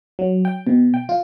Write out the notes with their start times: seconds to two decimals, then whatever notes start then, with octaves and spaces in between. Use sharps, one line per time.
0.19 F#3
0.45 G5
0.67 B2
0.94 G5
1.09 F4